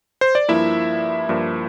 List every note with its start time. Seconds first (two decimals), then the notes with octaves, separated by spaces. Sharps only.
0.21 C5
0.35 D5
0.48 G2 F3 A#3 E4 E5
1.29 G2 F3 A#3